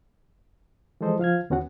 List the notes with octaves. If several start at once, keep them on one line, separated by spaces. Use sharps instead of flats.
E3 F3 G#3 A4 C5 D#5
F3 F5 F6 G#6
D#2 B3 C#4 F#4 F#5